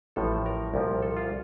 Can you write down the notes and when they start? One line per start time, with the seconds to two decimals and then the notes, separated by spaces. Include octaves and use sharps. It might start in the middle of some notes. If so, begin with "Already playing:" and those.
0.16 A1 A2 F3 A4
0.46 A#4
0.74 C2 A#2 F3
1.02 A4
1.17 F4